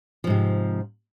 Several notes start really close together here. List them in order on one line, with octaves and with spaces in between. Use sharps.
F3 G#2 C3